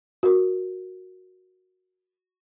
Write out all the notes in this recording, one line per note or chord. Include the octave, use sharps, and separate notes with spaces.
F#4 A#4